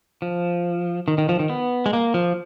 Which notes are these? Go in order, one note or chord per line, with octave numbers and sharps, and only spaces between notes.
F3
D#3
D#3
F3
D#3
B3
G#3
A#3
F3